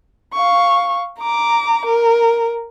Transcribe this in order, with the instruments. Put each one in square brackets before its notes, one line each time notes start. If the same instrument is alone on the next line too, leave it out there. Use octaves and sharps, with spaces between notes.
[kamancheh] F5 C#6
A#5 D6
A#4